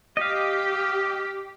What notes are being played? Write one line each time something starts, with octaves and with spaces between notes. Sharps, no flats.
G4 D#5 F5